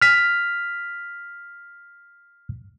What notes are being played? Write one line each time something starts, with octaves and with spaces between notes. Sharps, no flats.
F6 B6